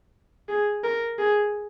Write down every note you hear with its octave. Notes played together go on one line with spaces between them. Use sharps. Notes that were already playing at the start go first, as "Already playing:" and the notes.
G#4
A#4
G#4